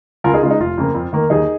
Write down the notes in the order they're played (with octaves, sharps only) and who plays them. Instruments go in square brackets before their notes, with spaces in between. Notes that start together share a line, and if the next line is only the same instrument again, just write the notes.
[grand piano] C#2 F4 A#4
D#4 G#4
C#3 F4
G#3 D#4
F1 F4
F2 C#3 A#3
F2
D#3 A#3
D#2 D#4 G#4